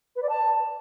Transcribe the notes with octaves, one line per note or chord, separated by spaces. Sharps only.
B4
D5
A5